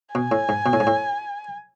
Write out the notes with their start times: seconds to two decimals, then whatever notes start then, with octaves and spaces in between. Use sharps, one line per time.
0.15 B2 G#5
0.31 A2
0.49 G#2
0.66 B2
0.73 A2
0.80 G#2
0.87 A2